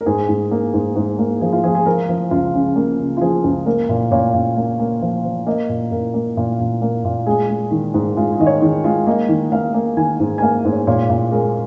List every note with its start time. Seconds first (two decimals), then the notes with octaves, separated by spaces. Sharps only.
0.01 A#4
0.06 G#2 G#4
0.28 G#2
0.51 A#3
0.73 G#2
0.96 G#2
1.19 A#3
1.41 F3 G#4
1.53 F4
1.64 F3 G#4
1.75 G#4
1.86 F3 A#4
2.09 F3
2.31 C#2 F4
2.54 C#3
2.76 A#3
2.99 C#3
3.17 F4
3.21 F3 G#4
3.44 C#2
3.66 A#3 A#4
3.89 A#2
4.11 A#2 C#5
4.34 A#2
4.56 A#3
4.80 A#3
5.02 F3
5.24 F3
5.47 A#3 D#5
5.69 A#2
5.91 A#2 A#4
6.14 A#3
6.37 A#2
6.59 A#2
6.82 A#3
7.05 A#2
7.26 G#3 G#4
7.49 G#3
7.71 D#3
7.94 G#2
8.16 G#3 F4
8.32 G#4
8.40 D#3 D#5
8.47 C#5
8.61 D#3 G#4
8.84 G#3 F4
9.07 A#3 D#5
9.29 D#3
9.52 A#3 F5
9.74 A#3
9.97 D#3 G#5
10.20 G#2
10.38 G#5
10.42 A#3 F5
10.65 G#2
10.72 C#5
10.87 A#2 C#5
11.09 A#2
11.32 G#3 A#4